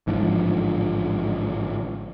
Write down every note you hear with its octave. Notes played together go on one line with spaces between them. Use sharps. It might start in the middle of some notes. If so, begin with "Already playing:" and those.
A1 G#2 D3 F3